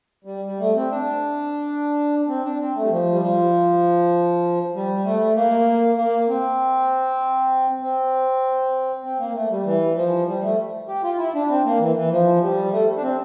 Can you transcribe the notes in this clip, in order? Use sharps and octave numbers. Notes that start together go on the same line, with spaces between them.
G3
G3
A3
C4
D4
C4
D4
C4
A3
G3
F3
G3
F3
G3
A3
A#3
A#3
C4
C4
C4
A#3
A3
G3
E3
F3
G3
A3
G4
F4
E4
D4
C4
A#3
E3
E3
F3
G3
A3
D4
C4